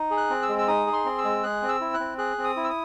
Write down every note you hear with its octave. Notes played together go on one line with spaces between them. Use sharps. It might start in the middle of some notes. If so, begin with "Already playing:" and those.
Already playing: D#4
G#4
F#6
C4
E6
G#3
E6
D#4 D#6
G#4
C6
C4
E6
G#3
G#4 F#6
C4
E6
E4
F#6
C4
G#4 F#6
C4
D#6
E4
E6
D#6